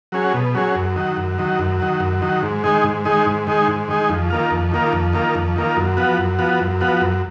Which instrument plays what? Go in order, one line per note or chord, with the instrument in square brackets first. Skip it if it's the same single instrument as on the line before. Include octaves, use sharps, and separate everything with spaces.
[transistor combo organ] F#3 C#4 G#4
B2
F#3 C#4 G#4
F#2
D#3 F#3
F#2
D#3 F#3
F#2
D#3 F#3
F#2
D#3 F#3
G#2
D#3 G#3 D#4 G#4
G#2
D#3 G#3 D#4 G#4
G#2
D#3 G#3 D#4 G#4
G#2
D#3 G#3 D#4 G#4
F2
D#3 A#3 F4
F2
D#3 A#3 F4
F2
D#3 A#3 F4
F2
D#3 A#3 F4
F#2
F3 B3 F#4
F#2
F3 B3 F#4
F#2
F3 B3 F#4
F#2